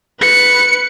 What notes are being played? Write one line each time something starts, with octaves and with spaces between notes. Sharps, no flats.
B4 C#7